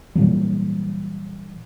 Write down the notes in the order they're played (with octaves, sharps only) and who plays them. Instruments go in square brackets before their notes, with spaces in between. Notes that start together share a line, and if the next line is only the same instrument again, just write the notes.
[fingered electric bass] A#2 E3 F#3 G3